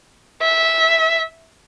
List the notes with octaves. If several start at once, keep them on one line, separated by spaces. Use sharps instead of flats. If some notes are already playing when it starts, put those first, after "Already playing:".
E5